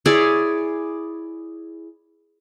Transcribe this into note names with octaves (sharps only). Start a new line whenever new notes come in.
E4 G#4 C#5 D5